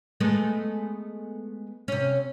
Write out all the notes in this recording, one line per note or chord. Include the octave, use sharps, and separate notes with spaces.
G#3 A3 B3
C3 C#4